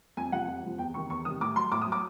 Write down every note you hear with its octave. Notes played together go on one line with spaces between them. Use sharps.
F2 G#5
C3 F3 F#5
F2
C3 F3
E2 G5
C3 D#3 C#6
E2 C#6
C3 D#3 D#6
A2 D6
F#3 C6
A2 D6
D#6
F#3
D6